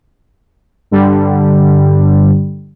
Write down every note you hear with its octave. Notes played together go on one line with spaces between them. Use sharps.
G2 D3 G3